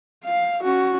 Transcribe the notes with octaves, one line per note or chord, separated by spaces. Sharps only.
F5
C#4 F#4